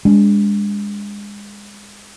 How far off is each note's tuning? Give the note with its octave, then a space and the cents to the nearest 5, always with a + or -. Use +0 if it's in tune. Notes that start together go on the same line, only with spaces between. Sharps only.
G#3 -25 D4 -25